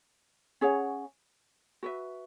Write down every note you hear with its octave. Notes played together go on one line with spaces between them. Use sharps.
C#4 G#4 C#5 F#5
F#4 B4 E5